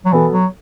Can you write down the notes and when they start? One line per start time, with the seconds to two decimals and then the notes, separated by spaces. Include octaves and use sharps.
0.05 F#3
0.12 B2 E3 B3 A4
0.32 F#3